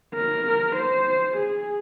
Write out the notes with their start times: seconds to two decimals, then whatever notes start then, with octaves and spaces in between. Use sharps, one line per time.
0.15 A#4
0.76 C5
1.37 G#4